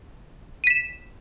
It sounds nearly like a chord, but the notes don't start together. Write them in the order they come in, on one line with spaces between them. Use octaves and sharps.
D#7 B6 E7